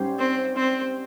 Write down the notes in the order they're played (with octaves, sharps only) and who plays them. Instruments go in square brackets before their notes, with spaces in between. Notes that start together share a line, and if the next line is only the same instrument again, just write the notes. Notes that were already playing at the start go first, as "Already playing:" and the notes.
Already playing: [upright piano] G#2 G3 C#4 G4 C5
[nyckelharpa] C4
C4